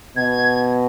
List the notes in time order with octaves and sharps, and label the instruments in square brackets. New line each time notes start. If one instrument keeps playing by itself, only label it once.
[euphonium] B2 [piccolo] G#6